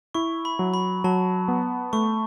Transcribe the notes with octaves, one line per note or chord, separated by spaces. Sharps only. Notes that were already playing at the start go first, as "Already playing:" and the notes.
E4 C#6
B5
F#3
B5
F#3 A5
B3
A3 C#6